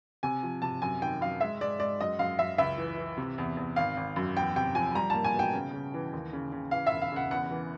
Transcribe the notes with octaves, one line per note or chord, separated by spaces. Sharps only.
C3 G#5
F3
C3 A5
F#2 G#5
D#3 G5
F#2 F5
G#3 E5
G#3 D5
G#3 D5
F#2 D#5
F#2 F5
F#2 E5
C#2 E5
E3
E3
C3
E2
E2
G#1 F5
G#1
F#2
E2 G5
C3 G5
F3 G#5
G3 A#5
A#3 A5
G#5
B2
G5
C#3
C#3
E3
D#2
C#3
C#3
E3 F5
E5
E1
F5
C#3 F#5
E2 F#5
E3